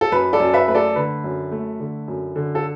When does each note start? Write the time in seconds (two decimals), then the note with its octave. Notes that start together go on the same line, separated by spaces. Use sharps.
0.01 A4
0.12 F#2 B4
0.33 A4 D5
0.40 F#2
0.53 B4 E5
0.67 A3 B4
0.75 A4 D5
0.96 D3 B4
1.24 F#2
1.51 A3
1.80 D3
2.08 F#2
2.36 D3
2.55 A4